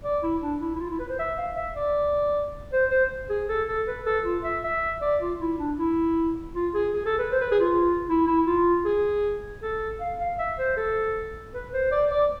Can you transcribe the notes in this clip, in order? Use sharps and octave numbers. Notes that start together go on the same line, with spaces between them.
D5
E4
D4
E4
E4
F4
E4
B4
C5
E5
F5
E5
D5
C5
C5
G#4
A4
A4
B4
A4
F4
E5
E5
D5
F4
E4
D4
E4
F4
G#4
G#4
A4
B4
C5
B4
G#4
F4
E4
E4
F4
G#4
A4
F5
F5
E5
C5
A4
B4
C5
D5
D5